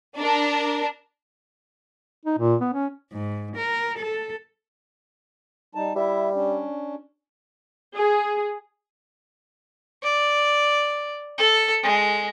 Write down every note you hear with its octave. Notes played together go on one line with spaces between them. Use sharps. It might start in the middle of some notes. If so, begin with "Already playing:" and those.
D4 A#4
D#4
A#2
B3
C#4
G#2
A#4
A4
G3 D#4 A5
G3 E4 E5
C#4 D4
G#4
D5
A4
G#3